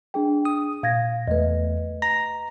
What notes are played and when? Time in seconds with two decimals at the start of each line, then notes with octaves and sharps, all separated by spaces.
0.14 D4 G#4 G5
0.45 D#6
0.83 A#2 F5 G#6 A#6
1.27 E2 A3 B4 D#5
2.02 A#5 A#6